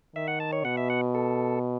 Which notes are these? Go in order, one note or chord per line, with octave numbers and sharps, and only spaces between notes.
D#3 E5
F#5
A5
C#5
B2 F#5
E5
F#5
A4